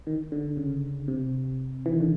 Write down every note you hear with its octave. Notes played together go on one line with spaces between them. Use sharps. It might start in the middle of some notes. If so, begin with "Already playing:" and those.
D#3
D3
C#3
C3
E3
D#3
D3